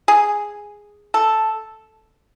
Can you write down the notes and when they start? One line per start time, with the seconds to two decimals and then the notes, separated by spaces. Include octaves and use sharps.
0.08 G#4
1.14 A4